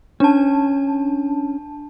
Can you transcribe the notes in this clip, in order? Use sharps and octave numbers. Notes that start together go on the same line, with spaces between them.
C#4 D4 A5